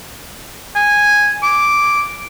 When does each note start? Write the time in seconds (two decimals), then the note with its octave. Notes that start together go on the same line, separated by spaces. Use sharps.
0.76 G#5
1.43 D6